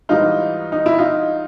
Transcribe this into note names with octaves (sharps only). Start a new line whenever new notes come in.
G#2 E3 G3 D#4 F4
D#4
E4
D#4 F4